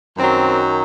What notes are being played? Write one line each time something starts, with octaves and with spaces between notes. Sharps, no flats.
F#2 D#3 F#3 C4